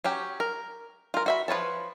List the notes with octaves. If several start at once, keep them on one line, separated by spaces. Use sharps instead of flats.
F#3 C#4 G4
A#4
F4 A#4
F#4 E5 B5
F3 B4 C#5 A5